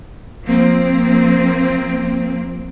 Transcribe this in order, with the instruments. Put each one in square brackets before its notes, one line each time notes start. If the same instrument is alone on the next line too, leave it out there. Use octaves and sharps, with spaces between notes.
[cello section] F3 A#3 C4